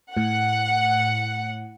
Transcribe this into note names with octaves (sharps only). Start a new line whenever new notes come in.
A2 F#5